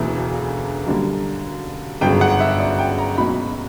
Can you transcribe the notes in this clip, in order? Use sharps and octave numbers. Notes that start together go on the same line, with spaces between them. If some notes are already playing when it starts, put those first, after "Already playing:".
Already playing: E1 D2 C#3 E3 A#3 E5
F#2 D3 G3 A#3
G1 F#2 C#3 G5
F#5
E5
D5
G5
A#5
C#2 B2 F#3 A#3 B5